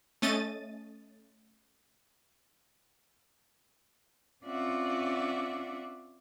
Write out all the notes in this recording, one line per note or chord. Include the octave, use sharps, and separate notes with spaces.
A3 C#4 D#5 A6 D#7
C4 C#4 F4 D5 E5 F#5